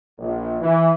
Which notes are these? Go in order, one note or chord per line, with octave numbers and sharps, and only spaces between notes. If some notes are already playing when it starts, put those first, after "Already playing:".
A#1
E3